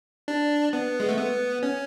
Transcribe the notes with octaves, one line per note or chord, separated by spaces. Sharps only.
D4
B3
G#3
A3
B3
C#4